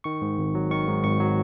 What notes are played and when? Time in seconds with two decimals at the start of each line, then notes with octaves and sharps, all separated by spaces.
0.04 D#3 C#6
0.22 G#2
0.38 G#1
0.55 F#3
0.71 D#3 C#6
0.87 G#2
1.04 G#1 C#6
1.20 F#3